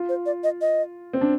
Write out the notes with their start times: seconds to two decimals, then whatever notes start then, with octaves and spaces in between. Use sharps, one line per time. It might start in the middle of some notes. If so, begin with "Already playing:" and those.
Already playing: F4
0.09 C5
0.26 D5
0.44 D#5
0.61 D#5
1.13 C4
1.21 D4